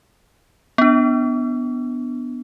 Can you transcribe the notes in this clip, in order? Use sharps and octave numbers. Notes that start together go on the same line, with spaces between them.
B3 D4